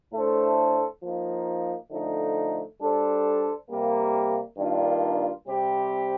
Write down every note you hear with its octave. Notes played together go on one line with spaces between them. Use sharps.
A2 A3 D4 A4 C5
F3 A#3 D#4
D3 F3 A3 D#4
G3 D4 A4 C5
C3 G3 A#3
G2 D#3 A#3 D4 F4
C3 G3 C4 G4